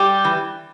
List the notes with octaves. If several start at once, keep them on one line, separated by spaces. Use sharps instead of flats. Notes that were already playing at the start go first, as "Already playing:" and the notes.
Already playing: G3 G4
E3